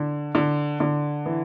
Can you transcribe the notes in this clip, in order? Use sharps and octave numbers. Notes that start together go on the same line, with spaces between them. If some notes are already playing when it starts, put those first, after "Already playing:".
Already playing: D3
D3
D3
E3